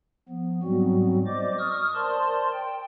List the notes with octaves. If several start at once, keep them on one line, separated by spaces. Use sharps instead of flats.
F3 B3
G#2 F#3 G3 B3 C4 F#4
C5 D5 D#5 D6
C#6 D#6 F6
A#4 C5 D5 A5 C6
G5